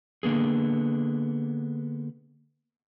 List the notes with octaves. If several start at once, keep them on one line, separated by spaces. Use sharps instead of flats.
D3 A#3 B3 G#4